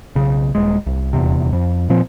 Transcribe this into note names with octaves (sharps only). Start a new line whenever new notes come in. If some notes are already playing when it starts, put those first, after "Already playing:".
B1 C#3
D#1 G#3
C2
D#1 E2 C3
F2
A#2 F3 C4